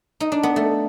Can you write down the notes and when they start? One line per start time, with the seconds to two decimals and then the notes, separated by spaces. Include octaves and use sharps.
0.20 D#4
0.32 D4
0.43 B3
0.56 A3